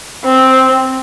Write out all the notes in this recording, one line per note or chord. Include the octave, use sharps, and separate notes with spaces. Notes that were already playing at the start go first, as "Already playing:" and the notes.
C4